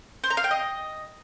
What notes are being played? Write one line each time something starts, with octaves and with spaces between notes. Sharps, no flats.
C5
A#5
F5
G5
D#5